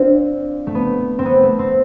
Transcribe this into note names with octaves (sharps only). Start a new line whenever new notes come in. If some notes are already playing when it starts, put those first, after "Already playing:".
Already playing: C4 D4 F4
A3
B3
C4
B3
A3
C4